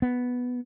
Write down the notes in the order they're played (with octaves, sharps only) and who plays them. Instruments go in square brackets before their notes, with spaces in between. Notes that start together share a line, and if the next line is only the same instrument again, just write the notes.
[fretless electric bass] B3